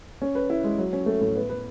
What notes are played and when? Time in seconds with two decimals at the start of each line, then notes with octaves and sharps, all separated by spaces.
0.22 C#4
0.35 B4
0.50 E4
0.64 G#3
0.78 F#3
0.93 C#4
1.06 A3
1.21 A2
1.35 B3
1.49 B4